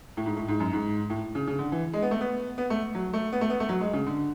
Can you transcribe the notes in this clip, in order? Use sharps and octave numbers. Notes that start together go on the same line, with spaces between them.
A2
G#2
A2
G#2
F#2
G#2
A2
C#3
C#3
D3
E3
G#3
B3
A3
B3
B3
A3
F#3
A3
B3
A3
B3
A3
F#3
G#3
C#3
D3